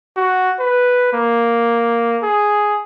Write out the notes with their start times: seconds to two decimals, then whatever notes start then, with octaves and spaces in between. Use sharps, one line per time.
0.17 F#4
0.60 B4
1.13 A#3
2.23 G#4